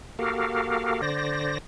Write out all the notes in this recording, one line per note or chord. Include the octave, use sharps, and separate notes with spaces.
A#3 F#4 G4 A4 A#4 F5
D3 C5 D5 A#6